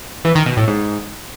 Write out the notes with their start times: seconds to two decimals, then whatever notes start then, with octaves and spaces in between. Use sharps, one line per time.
0.25 E3
0.35 D#3
0.46 B2
0.57 A2
0.68 G#2